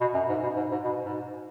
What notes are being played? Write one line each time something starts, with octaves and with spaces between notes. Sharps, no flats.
B2
F#2
G#2
B2
G#2
G#2
B2
G#2